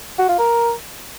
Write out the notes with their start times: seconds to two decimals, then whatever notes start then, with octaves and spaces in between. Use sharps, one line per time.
0.19 F#4
0.29 F4
0.39 A#4